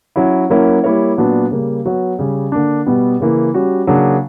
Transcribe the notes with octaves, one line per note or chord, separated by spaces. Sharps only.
F#3 C#4 E4
F#3 A#3 C#4 E4 A#4
G3 A#3 E4 A#4 C#5
A#2 F#3 B3 D4 F#4
C#3 G3 A#3
F#3 B3 F#4 C#5
C#3 G3 C#4
D3 A#3 D4
B2 G3 B3
C#3 E3 A#3
G3 C#4 F#4
C#3 F#3 A#3 D4